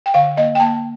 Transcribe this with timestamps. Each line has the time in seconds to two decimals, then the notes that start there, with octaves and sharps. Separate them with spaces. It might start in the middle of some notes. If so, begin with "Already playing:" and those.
0.06 G5
0.14 D3 F5
0.37 A#3 D#5
0.55 G5
0.60 A#3 A5